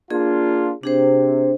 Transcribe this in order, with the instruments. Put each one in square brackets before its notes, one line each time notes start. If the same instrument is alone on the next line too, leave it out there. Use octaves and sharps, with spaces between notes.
[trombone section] A#3 D4 F4 [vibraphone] G#4
[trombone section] C3 [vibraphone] D4 G#4 C5